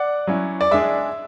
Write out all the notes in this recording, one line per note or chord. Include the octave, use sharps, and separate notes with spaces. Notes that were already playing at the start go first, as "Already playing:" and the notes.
Already playing: D5 F#5
F#3 C#4 E4
D5
G#3 D4 G#4 E5